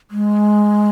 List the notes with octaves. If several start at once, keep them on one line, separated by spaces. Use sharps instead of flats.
G#3